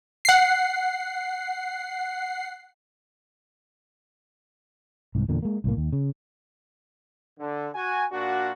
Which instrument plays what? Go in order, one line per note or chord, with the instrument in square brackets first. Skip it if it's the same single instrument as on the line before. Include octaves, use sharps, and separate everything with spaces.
[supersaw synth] F#5 C7
[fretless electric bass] C2 G#2
E2 A#2 D3
G#3 A#3
C2 A2 A#3
D#2
C#3
[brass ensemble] D3
F#4 G#5
A#2 A#3 D4 F#4